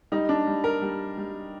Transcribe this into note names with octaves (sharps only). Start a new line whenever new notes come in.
G3 D#4
D4
G3
A#4
G3
G3